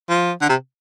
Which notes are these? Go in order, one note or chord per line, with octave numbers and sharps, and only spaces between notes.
F3
D3
C3